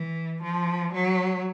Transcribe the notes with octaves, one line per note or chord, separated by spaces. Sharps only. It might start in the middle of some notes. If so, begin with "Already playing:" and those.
Already playing: E3
F3
F#3